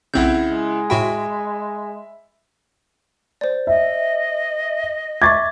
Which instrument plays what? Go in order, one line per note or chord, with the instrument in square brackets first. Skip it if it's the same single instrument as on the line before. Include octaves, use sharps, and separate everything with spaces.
[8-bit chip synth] B1 C4 G6 [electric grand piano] C#3 E4 F#5
[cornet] G#3
[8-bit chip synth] A2 F#4 G5 [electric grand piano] E5 B5
[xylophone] C5 D5
[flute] D#5 [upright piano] E5
[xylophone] E5 C#6 D6 [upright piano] G#6 A6